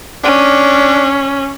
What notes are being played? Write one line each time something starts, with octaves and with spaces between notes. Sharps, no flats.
C#4 D4